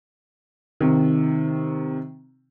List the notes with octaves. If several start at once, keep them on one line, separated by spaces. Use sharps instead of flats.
C3 D#3